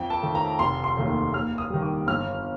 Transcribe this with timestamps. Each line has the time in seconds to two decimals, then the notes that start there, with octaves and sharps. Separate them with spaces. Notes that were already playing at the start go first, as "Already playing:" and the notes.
Already playing: F2 G5
0.10 A5
0.22 D#3 A3
0.35 A#5
0.59 F1 C6
0.84 C6
0.97 D#2 D#3 A3
1.33 D#2 F6
1.58 D#6
1.70 D#3 G3
1.82 D6
2.07 G1 F6